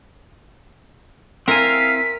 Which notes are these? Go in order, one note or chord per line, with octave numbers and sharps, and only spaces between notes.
C4 E4 A#4 F5 G#5 B6